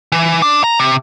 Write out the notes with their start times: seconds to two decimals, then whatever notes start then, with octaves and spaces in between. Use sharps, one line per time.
0.12 E3
0.42 D4
0.64 A#5
0.79 C3